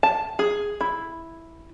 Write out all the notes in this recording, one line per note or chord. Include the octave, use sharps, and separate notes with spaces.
A5
G#4
E4